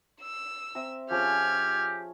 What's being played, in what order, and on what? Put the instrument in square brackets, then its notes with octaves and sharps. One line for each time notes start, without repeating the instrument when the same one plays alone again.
[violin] E6
[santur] C4 E5 A#5
[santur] F3 C#4 G#4 [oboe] G4 [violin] F6 G#6